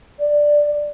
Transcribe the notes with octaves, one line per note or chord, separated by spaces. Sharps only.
D5